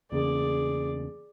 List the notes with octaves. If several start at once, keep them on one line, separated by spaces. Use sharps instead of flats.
E2 C#3 A#3 G#4 D5